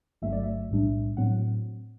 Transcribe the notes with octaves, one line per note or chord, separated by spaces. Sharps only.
G1 G2 F#3 A3 E5
D5
E5
B1 A2 G3 D4
A2 F#3 C4 F#5